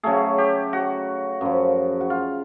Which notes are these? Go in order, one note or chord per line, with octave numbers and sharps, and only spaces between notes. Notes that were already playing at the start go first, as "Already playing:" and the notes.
C#3 F#3 A3 G#4
G4
F#4
F#2 C#3 F3
F#4
F4